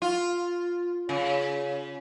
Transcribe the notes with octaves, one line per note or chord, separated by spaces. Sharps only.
F4
C#3